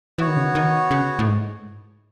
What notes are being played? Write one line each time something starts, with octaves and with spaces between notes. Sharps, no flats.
E3 B3 F#4 C#5
D#3
C#3
D#3
D#3
C#3
A2
G#2